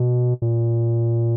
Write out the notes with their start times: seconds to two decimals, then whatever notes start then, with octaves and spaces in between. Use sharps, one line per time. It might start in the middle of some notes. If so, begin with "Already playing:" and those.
Already playing: B2
0.42 A#2